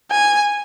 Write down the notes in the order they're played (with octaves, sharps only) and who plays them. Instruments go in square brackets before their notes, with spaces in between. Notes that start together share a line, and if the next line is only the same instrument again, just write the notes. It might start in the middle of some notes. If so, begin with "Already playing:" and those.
[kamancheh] G#5